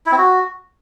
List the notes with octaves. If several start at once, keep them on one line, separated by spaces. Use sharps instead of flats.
E4
C4
F#4